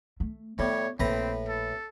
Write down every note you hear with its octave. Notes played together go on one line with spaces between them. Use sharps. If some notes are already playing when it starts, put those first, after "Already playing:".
A3
A2 G3 B3 C#5
A#1 A2 C4 B4 A#5
A4